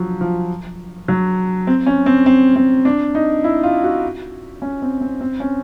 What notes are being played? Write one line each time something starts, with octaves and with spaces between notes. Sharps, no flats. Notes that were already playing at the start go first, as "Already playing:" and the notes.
Already playing: F3 F#3
F3
F#3
C4
C#4
C4
C4
C4
D4
D#4
E4
F4
F#4
C#4
C4
C4
C4
C#4